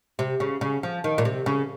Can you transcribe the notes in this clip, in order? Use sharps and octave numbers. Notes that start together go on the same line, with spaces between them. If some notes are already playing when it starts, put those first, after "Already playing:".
C3
C#3
C#3
F3
D#3
A#2
C3
C#3